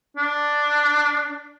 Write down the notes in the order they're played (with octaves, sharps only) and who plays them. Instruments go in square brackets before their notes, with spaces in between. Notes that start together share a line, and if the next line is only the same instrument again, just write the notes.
[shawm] D4